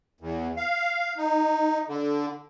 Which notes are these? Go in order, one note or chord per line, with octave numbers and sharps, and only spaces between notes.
E2
F5
D#4
D3